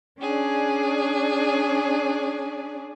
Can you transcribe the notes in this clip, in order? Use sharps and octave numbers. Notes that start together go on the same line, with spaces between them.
C#4 D4 G#4 D5